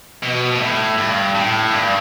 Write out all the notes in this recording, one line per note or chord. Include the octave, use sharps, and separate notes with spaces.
B2
B2
A2
G2
A2
G2